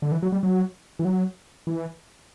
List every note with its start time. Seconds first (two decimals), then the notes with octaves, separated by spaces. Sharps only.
0.02 D3
0.12 E3
0.23 F#3
0.32 G3
0.43 F#3
0.99 E3
1.05 F#3
1.67 E3